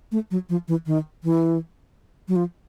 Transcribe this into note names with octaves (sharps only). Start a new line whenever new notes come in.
A3
F#3
F3
E3
D#3
E3
F#3
F3